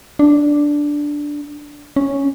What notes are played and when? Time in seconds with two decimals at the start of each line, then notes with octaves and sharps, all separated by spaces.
0.19 D4
1.96 C#4